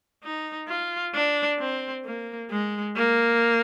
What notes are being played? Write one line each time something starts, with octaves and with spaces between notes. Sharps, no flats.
D#4
F4
D4
C4
A#3
G#3
A#3